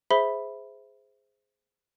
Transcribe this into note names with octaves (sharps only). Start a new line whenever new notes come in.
G#4 C5 E5 B5 B6 G7